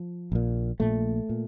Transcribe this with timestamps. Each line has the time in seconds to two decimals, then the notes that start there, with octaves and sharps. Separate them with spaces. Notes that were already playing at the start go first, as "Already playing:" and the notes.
Already playing: F3
0.32 A#1 A#2
0.80 A#1 A#2 A3
1.29 A#2